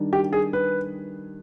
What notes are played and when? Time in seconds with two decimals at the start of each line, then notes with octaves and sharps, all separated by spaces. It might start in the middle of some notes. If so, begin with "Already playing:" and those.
Already playing: D#3 G3 D4
0.13 G4
0.33 G#4
0.53 B4